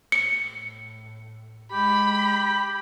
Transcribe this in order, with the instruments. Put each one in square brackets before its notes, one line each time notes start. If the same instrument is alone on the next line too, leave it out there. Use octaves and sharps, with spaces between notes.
[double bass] A2 [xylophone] C#7
[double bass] G#3 [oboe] G4 [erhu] B5